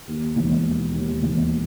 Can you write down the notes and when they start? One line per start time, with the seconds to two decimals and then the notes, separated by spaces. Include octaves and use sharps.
0.07 D#2
0.36 E1
0.64 D#2
0.93 D#2
1.22 E1